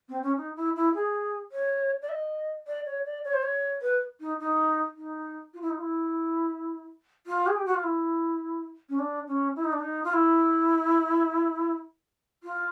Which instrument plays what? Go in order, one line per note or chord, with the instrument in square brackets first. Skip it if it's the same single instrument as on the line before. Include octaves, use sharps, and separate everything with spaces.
[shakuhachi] C4
C#4
D#4
E4
E4
G#4
C#5
D5
E5
D#5
D5
C#5
D5
C#5
C5
C#5
B4
D#4
D#4
D#4
F4
E4
D#4
F4
E4
F4
G#4
G4
F#4
F4
E4
C#4
D4
C#4
E4
D#4
D4
D#4
F4
E4
F4